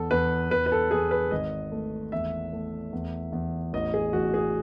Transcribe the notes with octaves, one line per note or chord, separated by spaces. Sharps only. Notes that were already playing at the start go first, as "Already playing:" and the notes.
Already playing: E2 A4
E2 B4
E2 B4
B4
A4
E2 G#4
B4
G#1 D#5
A3
E2 E5
A3
E2
E2
A1 D#5
G#4
A1 F#4
G#4